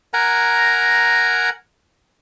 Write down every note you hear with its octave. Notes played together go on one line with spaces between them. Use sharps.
A#4 F#5 G#5 A#5